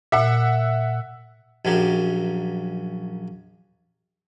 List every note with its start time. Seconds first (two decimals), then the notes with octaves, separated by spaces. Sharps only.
0.12 A#2 E5 F#5
1.65 A#1 F#2 F#3 G4